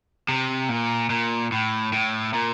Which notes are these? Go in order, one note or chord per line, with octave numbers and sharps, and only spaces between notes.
C3
A#2
A#2
A2
A2
A#2